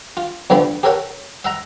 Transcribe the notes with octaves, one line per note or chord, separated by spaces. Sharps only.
F4
E2 D3 F3 G3 B5
G4 A4 A#4 C#5 F#5
E5 F#5 A#5